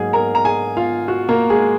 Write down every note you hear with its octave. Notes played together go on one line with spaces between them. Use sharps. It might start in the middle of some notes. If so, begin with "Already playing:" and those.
Already playing: G#2 F#3 A#3 G#4 G#5
A#4 A#5
A#5
G#4 G#5
F4 F5
F#4
A#3 A#4
G#3 G#4